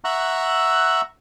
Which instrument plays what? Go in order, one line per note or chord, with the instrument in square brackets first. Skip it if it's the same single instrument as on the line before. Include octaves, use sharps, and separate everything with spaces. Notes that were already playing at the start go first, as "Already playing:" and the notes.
[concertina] E5 F#5 A#5 C#6 E6 F#6